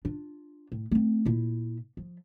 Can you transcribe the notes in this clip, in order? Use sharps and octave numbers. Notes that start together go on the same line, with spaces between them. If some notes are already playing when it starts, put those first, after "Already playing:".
D4 F4
A2
A3 C4
A#2 E4
F3